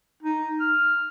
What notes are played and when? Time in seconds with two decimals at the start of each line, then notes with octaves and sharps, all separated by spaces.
0.23 D#4
0.60 F6